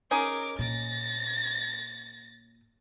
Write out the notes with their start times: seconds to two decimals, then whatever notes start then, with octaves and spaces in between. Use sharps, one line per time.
0.11 C#4 D#4 G#4 A#4 D6
0.59 A#2 A6 A#6